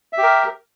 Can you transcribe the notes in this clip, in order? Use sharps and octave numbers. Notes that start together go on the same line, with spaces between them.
G4 A#4 E5